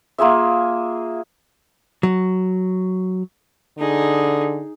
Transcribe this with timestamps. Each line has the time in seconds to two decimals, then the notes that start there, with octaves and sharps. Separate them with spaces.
0.18 A#3 F4 G#4 E5
2.03 F#3
3.79 D3 D#4 G#4